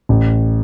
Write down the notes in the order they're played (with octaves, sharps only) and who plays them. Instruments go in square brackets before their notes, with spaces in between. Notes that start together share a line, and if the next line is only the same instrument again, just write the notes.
[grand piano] A1